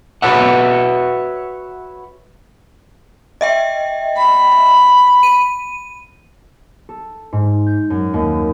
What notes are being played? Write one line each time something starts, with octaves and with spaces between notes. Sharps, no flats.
F#4 B4 C#5 E5 F#5
D#5 E5 G5
B5
D#7
A4
G#2
G6
F#2
D#2